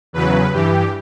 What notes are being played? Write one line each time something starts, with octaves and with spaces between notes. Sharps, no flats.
E2 C#3 F#3 B4
G2 E3 G4